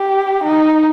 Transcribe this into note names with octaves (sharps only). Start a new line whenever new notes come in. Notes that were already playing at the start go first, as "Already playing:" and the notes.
Already playing: G4
D#4